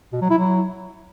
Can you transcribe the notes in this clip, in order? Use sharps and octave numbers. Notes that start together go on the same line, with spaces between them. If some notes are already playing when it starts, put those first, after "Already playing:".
B2
F#3
E4
F#3